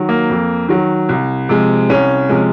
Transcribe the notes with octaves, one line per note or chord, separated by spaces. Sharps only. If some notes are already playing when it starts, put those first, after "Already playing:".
Already playing: D#3 F#3
A#3
F2
D#3 F#3
C2
C3 F3 G#3
C2 C#4
C3 F3 G#3